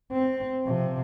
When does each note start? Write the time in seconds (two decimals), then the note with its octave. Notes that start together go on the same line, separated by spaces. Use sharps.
0.12 C4
0.66 C3 F3